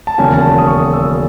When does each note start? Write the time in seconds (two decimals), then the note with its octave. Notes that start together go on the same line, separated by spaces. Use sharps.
0.07 A5
0.18 E1 D#2 C#3 F#3 C#4 G#5
0.34 A5
0.58 D#6
0.67 C#6
0.78 D#6
0.93 E6
1.07 D#6